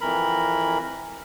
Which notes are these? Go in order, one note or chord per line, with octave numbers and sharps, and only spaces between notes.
F2 E3 A#4 B5